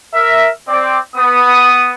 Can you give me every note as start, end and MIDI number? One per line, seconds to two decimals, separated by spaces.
0.13 0.49 70
0.13 0.49 76
0.68 0.97 60
0.68 0.97 74
1.16 1.93 59
1.16 1.93 87